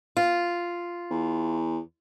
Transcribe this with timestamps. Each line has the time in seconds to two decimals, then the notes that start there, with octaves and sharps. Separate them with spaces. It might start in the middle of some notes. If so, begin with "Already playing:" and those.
0.17 F4
1.11 E2